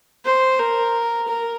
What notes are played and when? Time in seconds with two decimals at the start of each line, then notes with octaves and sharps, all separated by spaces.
0.25 C5
0.59 A#4
1.28 A#4